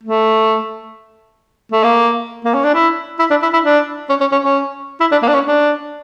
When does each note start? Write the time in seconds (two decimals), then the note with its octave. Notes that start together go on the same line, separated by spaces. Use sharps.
0.04 A3
1.72 A3
1.84 A#3
2.45 A#3
2.54 C#4
2.64 D4
2.74 E4
3.20 E4
3.31 D4
3.43 E4
3.53 E4
3.65 D4
4.09 C#4
4.21 C#4
4.32 C#4
4.43 C#4
5.01 E4
5.12 D4
5.23 A#3
5.29 D4
5.34 C#4
5.45 D4